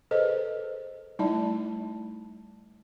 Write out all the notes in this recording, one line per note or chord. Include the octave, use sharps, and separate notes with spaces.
G#4 A4 B4 C5 D#5
G3 A3 D#4 E4 D5 A5